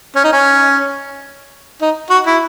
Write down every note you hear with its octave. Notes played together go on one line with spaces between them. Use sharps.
C#4
D#4
C#4
D#4
F#4
E4